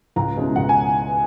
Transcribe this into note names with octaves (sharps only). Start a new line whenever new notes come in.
C#2 A#5
B2 G#3 C#4 E4
C#2 F#5
G#5